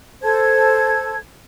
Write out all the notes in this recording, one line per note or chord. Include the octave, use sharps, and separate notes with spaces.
A4 C5 A5 G#6